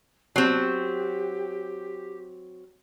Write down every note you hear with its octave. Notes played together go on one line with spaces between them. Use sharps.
F#3 C4 G4